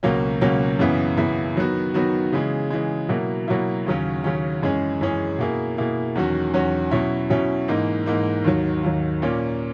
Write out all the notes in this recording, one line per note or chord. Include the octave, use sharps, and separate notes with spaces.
C#2 B2 F#3 A#3 C#4
C#2 B2 F#3 A#3 C#4
F#2 C#3 E3 B3 E4
F#2 C#3 E3 B3 E4
D#3 F#3 B3 F#4
D#3 F#3 B3 F#4
C#3 E3 G#3
C#3 E3 G#3
B2 F#3 A#3 E4
B2 F#3 A#3 E4
D#2 C#3 F#3 C#4
D#2 C#3 F#3 C#4
F#2 E3 G#3 C#4 G#4
F#2 E3 G#3 C#4 G#4
B2 A#3 E4 G#4
B2 A#3 E4 G#4
E2 D#3 F#3 C#4 F#4
E2 D#3 F#3 C#4 F#4
B2 F#3 C#4 E4
B2 F#3 C#4 E4
G#2 E3 A#3 D#4
G#2 E3 A#3 D#4
D#2 D#3 F#3
D#2 D#3 F#3
A#2 A#3 C#4